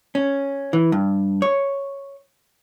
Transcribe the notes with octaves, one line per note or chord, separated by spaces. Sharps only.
C#4
E3
G2
C#5